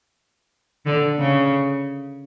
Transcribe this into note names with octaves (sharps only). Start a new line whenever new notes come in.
D3
C#3